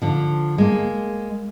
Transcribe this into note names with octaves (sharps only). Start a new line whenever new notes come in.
D3 F3
G#3 A#3